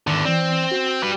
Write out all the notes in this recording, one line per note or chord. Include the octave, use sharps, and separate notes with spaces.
E2 G#2 D3 D#3
E3 C4 D5
F#4
G3 B4